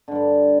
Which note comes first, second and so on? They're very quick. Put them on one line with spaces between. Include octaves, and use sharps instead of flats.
D3 G2 G3